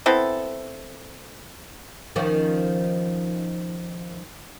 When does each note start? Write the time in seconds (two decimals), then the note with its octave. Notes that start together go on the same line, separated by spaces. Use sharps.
0.06 B3 C4 E4 A4
2.16 D#3 F3 C#4